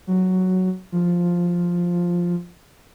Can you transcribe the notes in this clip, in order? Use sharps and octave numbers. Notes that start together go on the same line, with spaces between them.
F#3
F3